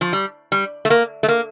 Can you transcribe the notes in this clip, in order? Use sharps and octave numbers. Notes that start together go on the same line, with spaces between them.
F3
G3
G3
A3
A#3
A3
A#3